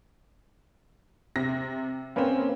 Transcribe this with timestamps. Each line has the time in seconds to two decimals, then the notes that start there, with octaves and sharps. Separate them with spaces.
1.36 C3 A#6
2.16 A#3 C4 C#4 B4 F5